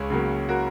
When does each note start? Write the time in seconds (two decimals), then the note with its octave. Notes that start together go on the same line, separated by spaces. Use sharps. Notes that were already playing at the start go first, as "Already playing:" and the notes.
Already playing: C#2 G#4 C#5
0.10 C#3 F#3 A#3
0.49 F#4 A#4